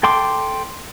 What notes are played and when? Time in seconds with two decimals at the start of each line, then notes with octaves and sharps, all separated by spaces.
0.03 A4 G5 C6 D6